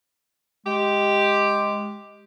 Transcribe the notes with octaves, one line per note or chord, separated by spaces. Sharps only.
G#3 G4